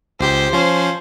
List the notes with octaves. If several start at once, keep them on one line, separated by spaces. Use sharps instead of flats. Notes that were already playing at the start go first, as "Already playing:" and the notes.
C#2 G4 C5 G6
F3 C#4